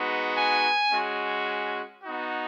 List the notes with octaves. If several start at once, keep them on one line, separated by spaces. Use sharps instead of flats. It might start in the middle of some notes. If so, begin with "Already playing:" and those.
Already playing: G#3 B3 D#4 F#4
G#5
G#3 C#4 F#4
B3 D#4 F#4